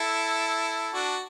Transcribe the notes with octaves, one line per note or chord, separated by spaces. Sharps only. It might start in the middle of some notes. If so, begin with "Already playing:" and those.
Already playing: E4 A4
D4 F#4